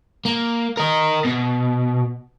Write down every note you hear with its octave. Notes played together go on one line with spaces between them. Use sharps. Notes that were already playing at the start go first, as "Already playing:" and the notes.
A#3
A#4 D#5
B2